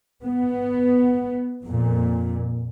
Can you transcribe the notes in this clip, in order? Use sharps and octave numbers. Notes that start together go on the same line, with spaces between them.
B3
F2 A#2